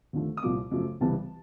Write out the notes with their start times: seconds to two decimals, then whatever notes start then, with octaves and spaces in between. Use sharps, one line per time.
0.13 D#2 D3 F3 A3
0.37 D#6
0.42 C2 A#2 F3 A#3 D6
0.71 F#2 C#3 F3 A3
1.01 C#2 C3 E3 G3 A5